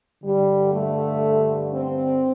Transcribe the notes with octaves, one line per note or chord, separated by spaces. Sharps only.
G2 D3 G3
A3
C4